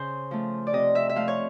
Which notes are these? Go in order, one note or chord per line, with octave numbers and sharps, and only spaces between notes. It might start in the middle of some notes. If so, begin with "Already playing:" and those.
Already playing: C#3 C5
F3 A3
D5
C3 D#5
E5
E5
F3 A3 F5
C#5